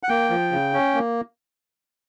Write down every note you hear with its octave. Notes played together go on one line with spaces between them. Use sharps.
F#5
A#3 G5
F3
C#3
C#4
A#3